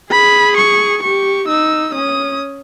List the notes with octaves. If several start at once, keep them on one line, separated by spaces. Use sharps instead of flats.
G#4 B5
C#6
G4 C#6
D#4 E6
C#4 D#6